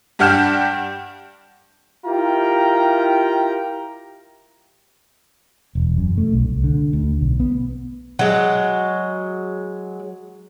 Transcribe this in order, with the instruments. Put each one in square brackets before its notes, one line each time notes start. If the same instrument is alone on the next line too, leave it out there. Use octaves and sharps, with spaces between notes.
[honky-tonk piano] G2 G4 F#5 F6 G6 E7
[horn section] E4 F4 G4 A#4 G5 A#5
[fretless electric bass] E1
F#2
A3
B1
C2
D3
D2
B1
B3
[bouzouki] F#3 G#3